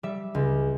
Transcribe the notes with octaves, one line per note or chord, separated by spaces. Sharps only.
G3 E5
C#2